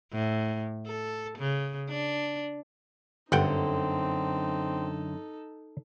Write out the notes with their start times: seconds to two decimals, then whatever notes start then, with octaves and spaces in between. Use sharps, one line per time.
0.13 A2
0.87 A4
1.38 C#3
1.89 D4
3.32 G1 F#2 D3 C4 D#4 A4 F#5 G5